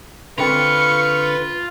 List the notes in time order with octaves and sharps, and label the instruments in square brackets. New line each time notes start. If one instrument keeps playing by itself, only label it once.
[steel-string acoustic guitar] D3 C4 G5 [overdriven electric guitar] F4 [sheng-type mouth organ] B4 [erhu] C#6